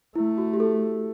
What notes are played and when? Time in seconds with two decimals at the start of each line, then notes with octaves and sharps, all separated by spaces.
0.15 A3 E4
0.38 F#4
0.53 G4
0.60 A4